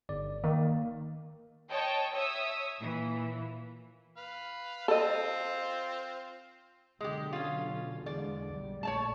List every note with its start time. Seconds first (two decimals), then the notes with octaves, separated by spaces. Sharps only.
0.09 G1 D5
0.44 D#3 A#3
1.71 C#5 D#5 G5 A5
2.15 C#5 E5 D#6 E6
2.79 A#2 E3
4.17 B4 F5
4.88 C4 F4 A4 D#5
7.01 B2 D3 F#3 G#3 G4
7.33 C#4 F4
8.06 E2 D3 G#3 D5
8.52 B1 G3
8.83 A#1 A3 C#5 D5 A5